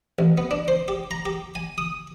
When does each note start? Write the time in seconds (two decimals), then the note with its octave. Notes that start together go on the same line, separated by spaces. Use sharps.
0.19 A1
0.38 B3
0.51 D4
0.68 C5
0.88 G4
1.11 A#5
1.26 G4
1.55 G#5
1.78 D#6